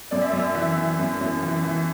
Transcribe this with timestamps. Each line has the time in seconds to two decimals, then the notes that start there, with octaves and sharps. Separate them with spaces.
0.11 F#2 D5
0.22 E5
0.31 F#2 D5
0.55 E3 E5
0.77 E3
0.99 F#2
1.21 F#2
1.43 E3
1.64 E3